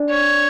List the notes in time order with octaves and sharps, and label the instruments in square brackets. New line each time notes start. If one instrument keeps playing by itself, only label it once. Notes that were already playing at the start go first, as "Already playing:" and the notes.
Already playing: [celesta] D4 D5
[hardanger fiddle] C#5